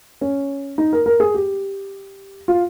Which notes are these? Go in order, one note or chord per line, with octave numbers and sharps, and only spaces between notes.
C#4
D#4
A#4
A#4
G#4
G4
F4